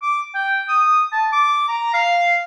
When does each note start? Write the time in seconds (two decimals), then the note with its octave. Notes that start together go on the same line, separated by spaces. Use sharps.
0.02 D6
0.34 G5
0.69 D#6
1.12 A5
1.32 D6
1.68 A#5
1.93 F5